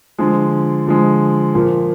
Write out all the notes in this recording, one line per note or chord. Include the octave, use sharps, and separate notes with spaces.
D3 F3 G#3
D3 F3 G#3
A#2 F3 A#3